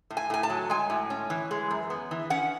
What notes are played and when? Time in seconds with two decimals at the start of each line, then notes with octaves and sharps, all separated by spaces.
0.10 A2
0.17 G#5
0.30 A2 G#5
0.43 A5
0.50 F#3
0.70 G#3 G#5
0.90 A2
1.10 C#4
1.30 E3
1.51 G#3
1.71 F#2
1.90 B3
2.11 E3
2.30 C#4 F#5